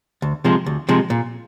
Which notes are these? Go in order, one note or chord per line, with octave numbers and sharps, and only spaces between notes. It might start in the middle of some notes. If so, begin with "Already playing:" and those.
D2
C3 F3 G#3
D2
C3 F3 G#3
A#2